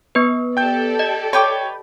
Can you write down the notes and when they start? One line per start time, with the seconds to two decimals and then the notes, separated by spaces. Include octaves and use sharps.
0.15 B3 B4
0.57 G4 A4 D5 G5 G6
0.99 D#5
1.33 B4 C#5 G5 D6